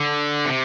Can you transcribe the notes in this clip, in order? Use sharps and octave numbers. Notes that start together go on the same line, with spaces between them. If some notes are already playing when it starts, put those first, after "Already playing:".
Already playing: D3
C3